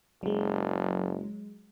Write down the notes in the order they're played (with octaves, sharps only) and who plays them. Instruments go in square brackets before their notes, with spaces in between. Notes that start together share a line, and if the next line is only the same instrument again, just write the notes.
[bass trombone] F#1 [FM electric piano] F#3 G#3